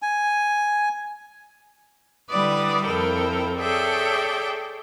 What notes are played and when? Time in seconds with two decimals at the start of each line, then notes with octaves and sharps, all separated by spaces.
0.02 G#5
2.30 D3 G3 E4 B4 D5 D#6
2.85 F2 E4 A4 A#4 G5
3.57 G#4 A4 C#5 D5 E5 G5